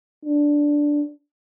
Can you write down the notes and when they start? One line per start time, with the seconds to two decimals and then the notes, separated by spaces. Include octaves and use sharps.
0.25 D4